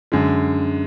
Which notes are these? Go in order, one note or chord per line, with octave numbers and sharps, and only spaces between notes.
F#2 D3 G#3